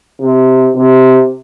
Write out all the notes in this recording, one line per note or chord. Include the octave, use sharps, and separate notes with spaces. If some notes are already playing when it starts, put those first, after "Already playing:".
C3
C3